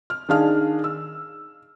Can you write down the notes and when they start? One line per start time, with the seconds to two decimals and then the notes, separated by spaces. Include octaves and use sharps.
0.10 F6
0.29 D#3 D4 G#4 F5 F6
0.84 E6